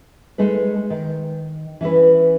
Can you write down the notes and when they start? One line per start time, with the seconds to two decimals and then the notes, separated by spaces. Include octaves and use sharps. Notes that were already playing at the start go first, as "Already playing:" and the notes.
0.38 G#3 A3 D#4 B4
0.90 D#3
1.81 E3 C#4 E4 B4